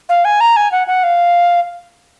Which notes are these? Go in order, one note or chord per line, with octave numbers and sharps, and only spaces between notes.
F5
G#5
A#5
G#5
F#5
F#5
F5